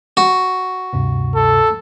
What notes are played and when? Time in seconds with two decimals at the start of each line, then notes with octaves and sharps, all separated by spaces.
0.17 F#4
0.93 D2 G2 C3
1.35 A4